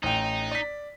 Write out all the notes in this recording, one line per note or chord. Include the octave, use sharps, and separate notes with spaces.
A1 D#4 G5
D5 B6